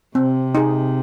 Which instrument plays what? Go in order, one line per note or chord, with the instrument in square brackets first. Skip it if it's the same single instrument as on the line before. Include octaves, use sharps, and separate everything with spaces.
[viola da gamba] C3 [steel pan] C4
[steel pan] D#4 G#4